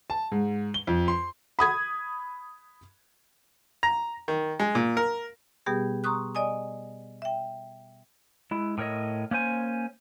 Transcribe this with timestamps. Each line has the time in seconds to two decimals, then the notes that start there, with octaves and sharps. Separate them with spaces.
0.10 A5
0.32 G#2
0.74 G7
0.87 F2
1.08 C6
1.59 B5 D#6 G#6
3.83 A#5
4.28 D#3
4.60 G#3
4.75 A#2
4.97 A#4
5.66 B2 G3 B3 G4 G#4
6.04 A#5 C6 C#6 D#6 F#6
6.35 D5 D#5 G#5 D#6
7.22 E5 G5
8.51 G#3 E4
8.78 A2 A#4 C#5 D#5
9.31 A#3 C#4 C5 G#5